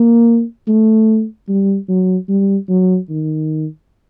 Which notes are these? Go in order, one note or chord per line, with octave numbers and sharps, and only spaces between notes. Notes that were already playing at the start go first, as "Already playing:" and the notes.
Already playing: A#3
A3
G3
F#3
G3
F#3
D#3